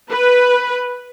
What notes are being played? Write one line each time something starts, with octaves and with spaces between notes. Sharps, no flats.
B4